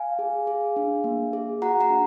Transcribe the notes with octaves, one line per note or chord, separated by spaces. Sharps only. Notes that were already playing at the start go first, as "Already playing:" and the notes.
Already playing: F5 G#5
G#4
G#4
D4
A#3
G#4
F#4 F#5 A#5
F#5 A#5
D4